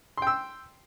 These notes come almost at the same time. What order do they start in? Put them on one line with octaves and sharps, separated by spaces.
C6 G5 E6